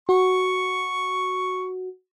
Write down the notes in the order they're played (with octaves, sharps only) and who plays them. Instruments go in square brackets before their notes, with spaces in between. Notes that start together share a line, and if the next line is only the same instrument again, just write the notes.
[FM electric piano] F#4 [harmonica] C#6